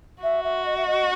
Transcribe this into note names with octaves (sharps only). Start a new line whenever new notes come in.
F#4 E5
E5
D#5
E5
D#5